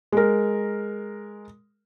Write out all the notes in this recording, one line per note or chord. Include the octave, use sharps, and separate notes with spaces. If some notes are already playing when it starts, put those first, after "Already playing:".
G#3 A#4